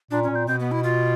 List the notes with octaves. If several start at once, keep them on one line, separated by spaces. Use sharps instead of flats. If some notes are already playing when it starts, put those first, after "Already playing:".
A#2 D4
C#4
A#2
C4
B2 C4
B3
E4
F4